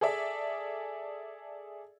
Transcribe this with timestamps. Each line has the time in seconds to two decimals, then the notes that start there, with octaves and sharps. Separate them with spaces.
0.01 G#4 A4 D5 E5